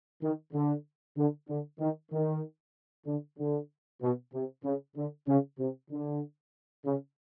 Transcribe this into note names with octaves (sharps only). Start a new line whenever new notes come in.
D#3
D3
D3
D3
D#3
D#3
D3
D3
B2
C3
C#3
D3
C#3
C3
D3
C#3